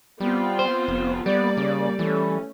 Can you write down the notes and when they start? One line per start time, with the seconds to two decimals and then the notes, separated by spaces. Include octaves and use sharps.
0.20 G3 B3 C4 F4
0.59 C5
0.88 F1
1.26 G3 A#3 B3 D5
1.57 C#3
1.99 E3 A3 C#4